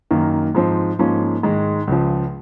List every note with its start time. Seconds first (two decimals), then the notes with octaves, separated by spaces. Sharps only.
0.11 F#2 D#3 A#3
0.55 G#2 F3 C4
0.99 G#2 F3 A#3 C#4
1.43 G#2 D#3 G#3
1.87 C#2 C#3 F3